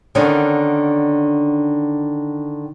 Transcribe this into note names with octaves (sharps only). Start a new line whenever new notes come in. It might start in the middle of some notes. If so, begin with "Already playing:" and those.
D3 D#3 B3 C#4 D4